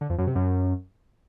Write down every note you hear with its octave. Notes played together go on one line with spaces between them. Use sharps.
D3
F2
F#2
C3
F#2